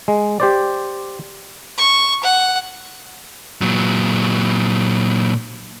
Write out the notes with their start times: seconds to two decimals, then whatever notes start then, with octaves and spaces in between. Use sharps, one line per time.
0.08 G#3
0.40 G4 C5 D5
1.78 C#6
2.24 F#5
3.61 A#2 F#3